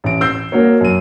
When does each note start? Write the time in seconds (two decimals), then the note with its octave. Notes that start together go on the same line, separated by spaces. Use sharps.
0.04 A1 D7
0.21 E6 G6 C7
0.52 A#3 F#4 A#4 C#5
0.81 F#2 D#7